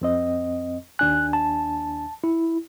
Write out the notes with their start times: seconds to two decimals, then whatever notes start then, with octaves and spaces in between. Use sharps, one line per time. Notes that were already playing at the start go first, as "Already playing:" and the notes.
0.01 F2 C4 D#5
0.99 D#2 D4 G#5 F#6
1.33 A5
2.24 E4